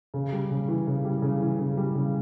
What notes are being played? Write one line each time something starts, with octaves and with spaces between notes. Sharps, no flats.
C#3
G3
C#3
E3
C#3
G3
C#3
E3
C#3
G3
C#3